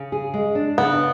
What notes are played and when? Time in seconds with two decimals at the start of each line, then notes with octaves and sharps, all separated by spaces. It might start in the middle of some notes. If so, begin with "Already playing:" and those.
Already playing: C#3
0.12 G#4
0.34 G#3
0.55 D4
0.78 C#3 B3